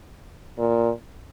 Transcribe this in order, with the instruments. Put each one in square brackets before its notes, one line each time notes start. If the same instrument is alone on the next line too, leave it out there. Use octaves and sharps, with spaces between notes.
[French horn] A#2